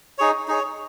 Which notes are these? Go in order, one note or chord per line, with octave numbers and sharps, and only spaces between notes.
D#4 G#4 C#5
D#4 G#4 C#5